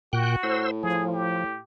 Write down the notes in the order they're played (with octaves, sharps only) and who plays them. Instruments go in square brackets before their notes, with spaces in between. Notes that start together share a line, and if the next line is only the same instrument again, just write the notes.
[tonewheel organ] A#2 G5 F#6 [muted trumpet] F#4
[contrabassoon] A2 [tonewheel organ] C5 E6
[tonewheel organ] F3 [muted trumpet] G#4
[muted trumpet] G4